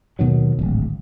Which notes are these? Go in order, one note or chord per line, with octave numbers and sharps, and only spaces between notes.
D#2 B2 D#3 F#3
D1 G#1